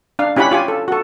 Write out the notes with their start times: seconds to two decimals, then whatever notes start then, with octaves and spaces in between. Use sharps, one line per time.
0.19 D4 F5
0.36 C#4 E4 G4 F#5 B5
0.51 F4 G4 G#5
0.68 A4
0.88 F#4 A4